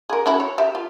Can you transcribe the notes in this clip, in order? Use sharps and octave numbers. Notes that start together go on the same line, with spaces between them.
G#4 A#4
C#4 E4 F#4
C#5
G4 E5
F4